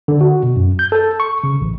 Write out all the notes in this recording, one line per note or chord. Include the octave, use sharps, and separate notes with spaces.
D3
F#4
B2
F#2
G6
A4
C#6
C#3
A1